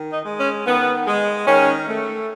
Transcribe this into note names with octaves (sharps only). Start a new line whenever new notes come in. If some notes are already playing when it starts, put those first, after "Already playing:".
Already playing: D#3
D#4
G#3
C#4
D#3 B3
G#3
D#3 C#4
A3